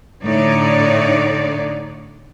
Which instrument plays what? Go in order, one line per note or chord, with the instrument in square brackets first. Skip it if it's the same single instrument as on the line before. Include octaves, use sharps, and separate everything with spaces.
[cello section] A2 D3 D4 D#4 C#5 D5